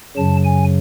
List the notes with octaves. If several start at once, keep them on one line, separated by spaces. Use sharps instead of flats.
F#2 C#3 F#3 A5
G#5